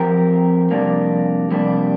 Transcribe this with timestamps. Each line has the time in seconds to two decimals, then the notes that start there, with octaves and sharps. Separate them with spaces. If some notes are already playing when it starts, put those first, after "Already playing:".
Already playing: F2 F3 C4 G4 A#4
0.71 F2 C3 G3 A#3 D4
1.51 F2 C3 G3 A#3 D4